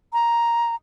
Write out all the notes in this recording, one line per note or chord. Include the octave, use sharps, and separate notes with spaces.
A#5